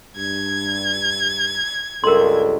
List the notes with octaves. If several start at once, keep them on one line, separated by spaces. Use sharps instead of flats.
G2 G#6
C#2 G2 A4 A#4 C6